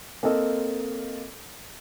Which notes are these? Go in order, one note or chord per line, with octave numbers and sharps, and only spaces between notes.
A#3 C4 A4 D#5